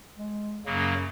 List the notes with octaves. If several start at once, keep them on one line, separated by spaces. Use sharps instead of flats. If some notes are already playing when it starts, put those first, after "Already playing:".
G#3
F#2 C#3 F#3 A#3